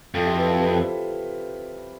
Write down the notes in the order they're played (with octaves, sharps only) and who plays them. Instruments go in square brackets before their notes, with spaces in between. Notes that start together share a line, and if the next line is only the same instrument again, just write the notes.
[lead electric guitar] F2 [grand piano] F4 A4
[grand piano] E4 G4
G4 B4
F4 A4
G4 B4
A4 C5
A4 C5